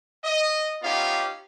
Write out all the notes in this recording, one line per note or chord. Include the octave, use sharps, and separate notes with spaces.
D#5
B3 C#4 D#4 F4 G4 F5